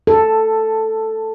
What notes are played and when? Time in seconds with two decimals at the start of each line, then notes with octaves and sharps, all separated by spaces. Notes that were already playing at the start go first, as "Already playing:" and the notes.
0.07 A4